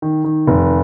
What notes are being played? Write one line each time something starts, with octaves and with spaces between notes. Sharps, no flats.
D#3
D#3
F1